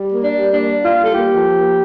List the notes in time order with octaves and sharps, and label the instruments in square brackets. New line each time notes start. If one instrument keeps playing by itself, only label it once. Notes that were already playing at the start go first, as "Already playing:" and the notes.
Already playing: [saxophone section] G3
A#3
D4
G3
A#3 D4
A#3
F4
G3
A4
A#3 G4
F3
A#3